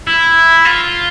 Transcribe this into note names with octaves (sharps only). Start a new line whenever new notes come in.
E4
F4